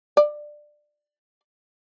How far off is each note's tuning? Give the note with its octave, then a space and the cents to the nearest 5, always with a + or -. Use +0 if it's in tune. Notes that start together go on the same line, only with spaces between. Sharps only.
D5 +15